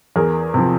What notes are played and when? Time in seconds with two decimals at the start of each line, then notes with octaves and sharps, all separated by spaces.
0.16 E2 G#4 A#4
0.54 C3 F3